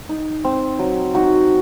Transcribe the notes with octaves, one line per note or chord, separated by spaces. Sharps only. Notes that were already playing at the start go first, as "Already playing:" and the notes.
D#4
C4
F#3
D#4 F#4